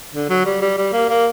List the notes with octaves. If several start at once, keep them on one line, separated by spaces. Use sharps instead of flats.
D3
F#3
G3
G3
G3
A#3
A#3